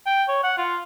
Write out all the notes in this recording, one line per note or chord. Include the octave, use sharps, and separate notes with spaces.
G5
C#5
F#5
F4